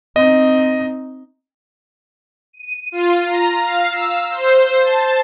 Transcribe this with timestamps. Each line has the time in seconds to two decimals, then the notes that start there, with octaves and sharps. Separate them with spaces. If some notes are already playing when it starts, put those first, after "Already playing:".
0.16 C4 D#4 D#5
2.53 D#7
2.92 F4
3.26 A#5
3.60 F5
3.90 E6
4.30 C5
4.84 A5